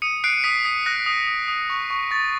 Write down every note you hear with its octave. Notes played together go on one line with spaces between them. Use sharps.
D#6 C#7 D#7
F#6 C7 D7
D#6 B6 C#7
D#6 C7
F#6 A#6
D#6
D#6
D#6
C#6
C#6
C#6 A6